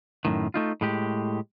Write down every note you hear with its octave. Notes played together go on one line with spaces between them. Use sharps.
F#2 A2 D#3
A3 D#4 F4
A2 G#3 G4